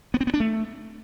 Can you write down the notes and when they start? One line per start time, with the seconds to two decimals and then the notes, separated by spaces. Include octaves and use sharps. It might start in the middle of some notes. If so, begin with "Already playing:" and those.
0.14 B3
0.21 C4
0.27 B3
0.34 D4
0.40 A3